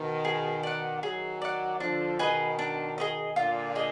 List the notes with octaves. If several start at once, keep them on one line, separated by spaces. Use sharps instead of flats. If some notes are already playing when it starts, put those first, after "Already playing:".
Already playing: B2 D#3
G#4
D5 F#5
D#3 F#3 G#4
D5 F#5
D3 F3 D4
B2 D#3 G#4 B4 D#5
D4
G#4 B4 D#5
A#2 D3 F4
G#4 D#5